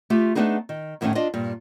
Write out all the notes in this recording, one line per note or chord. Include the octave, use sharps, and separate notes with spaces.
A3 F4 G4
A3 B3 C4 D4 D#4 G#4
D#3
E2 A2 D#3 A3 C#4
D4 F4 D5 D#5
G2 A#2